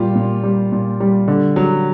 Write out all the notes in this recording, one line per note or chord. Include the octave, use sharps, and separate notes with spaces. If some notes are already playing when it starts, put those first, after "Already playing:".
Already playing: A#2 G3 F4 G4
A#2
G3
A#2
G3
D3
F#3